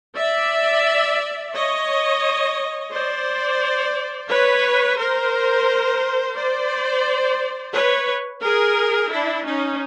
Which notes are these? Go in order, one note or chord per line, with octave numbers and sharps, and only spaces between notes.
D5 E5
C#5 D#5
C5 D5
B4 C#5
A#4 C5
C5 D5
B4 C#5
G#4 A#4
D4 E4
C#4 D#4